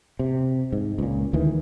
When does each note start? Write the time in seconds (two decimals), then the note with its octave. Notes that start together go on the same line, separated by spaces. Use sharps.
0.19 C3
0.73 G#2
0.98 C#2 A#2
1.33 D2 D#3 E3